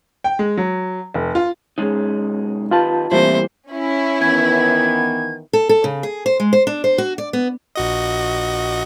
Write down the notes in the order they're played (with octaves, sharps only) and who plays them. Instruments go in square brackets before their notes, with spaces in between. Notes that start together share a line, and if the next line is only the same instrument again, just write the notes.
[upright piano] G5
G#3
F#3
F1
F4
[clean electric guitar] B1 G#3 D#4 [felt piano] C#4 G#4
[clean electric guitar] D#3 G4 B4 [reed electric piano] F4 A5
[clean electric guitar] C3 A3 E4 [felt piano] E3 G3 A#3 [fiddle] C5
[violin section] C#4 E4
[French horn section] D#3 E3 B3 [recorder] G#6
[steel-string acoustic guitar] A4
A4
C#3
G#4
C5
G#3
C5
D4
C5
F#4
D5
B3
[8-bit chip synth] A#1 F#4 D#5